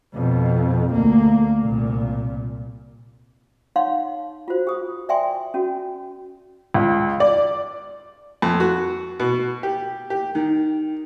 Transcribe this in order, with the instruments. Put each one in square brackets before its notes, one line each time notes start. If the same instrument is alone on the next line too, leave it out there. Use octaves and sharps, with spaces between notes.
[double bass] F2 B2
D2 A#3
C2 A#2
[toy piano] D#4 C#5 F5 F#5 C6
F4 F#4 C5
G4 D#6
D5 E5 G5 G#5 C6
C#4 F#4
[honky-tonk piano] C#2
D5
[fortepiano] F2
F#4
B2
G4
G4
D#3